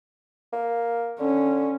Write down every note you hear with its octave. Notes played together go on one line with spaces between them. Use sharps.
A#3
D3 C#4